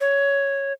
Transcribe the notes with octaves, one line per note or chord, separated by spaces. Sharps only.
C#5